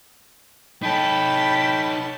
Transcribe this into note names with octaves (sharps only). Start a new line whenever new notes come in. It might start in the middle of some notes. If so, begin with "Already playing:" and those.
D#4 A4 C#5 G5 A5 B5